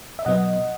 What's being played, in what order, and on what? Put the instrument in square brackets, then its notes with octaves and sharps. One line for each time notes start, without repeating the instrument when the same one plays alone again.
[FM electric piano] E5
B2 F#3 B3 D#5 F#5